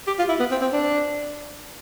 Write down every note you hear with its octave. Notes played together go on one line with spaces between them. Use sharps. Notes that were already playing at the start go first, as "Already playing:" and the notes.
G4
F4
E4
B3
C4
C4
D4